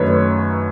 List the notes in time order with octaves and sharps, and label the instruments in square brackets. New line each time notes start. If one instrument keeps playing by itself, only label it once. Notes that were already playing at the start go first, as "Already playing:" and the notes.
Already playing: [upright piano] F#2 D#3 A3 B4 C#5